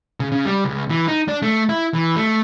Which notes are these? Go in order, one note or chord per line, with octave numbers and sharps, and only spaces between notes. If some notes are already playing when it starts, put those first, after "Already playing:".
C#3
C#3
G3
C#2
E3
D#4
D4
A3
E4
E3
A3